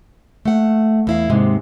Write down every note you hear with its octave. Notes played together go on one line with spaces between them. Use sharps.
A3 F#5
E2 E4 F5
D#2 G#2 C3 G#3